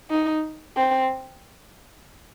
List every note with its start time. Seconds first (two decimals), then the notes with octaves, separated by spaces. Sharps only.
0.10 D#4
0.77 C4